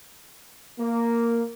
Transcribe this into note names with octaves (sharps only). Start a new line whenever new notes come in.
A#3